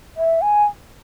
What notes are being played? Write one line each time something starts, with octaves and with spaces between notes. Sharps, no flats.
E5
G#5